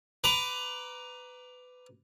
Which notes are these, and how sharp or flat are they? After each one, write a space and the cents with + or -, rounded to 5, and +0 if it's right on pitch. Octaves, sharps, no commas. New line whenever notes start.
B4 +20 A#5 +15 D6 +0